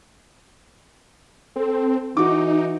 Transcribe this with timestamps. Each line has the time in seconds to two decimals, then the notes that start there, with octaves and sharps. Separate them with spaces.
1.56 C4 A4
2.17 E3 D#4 F#4 D6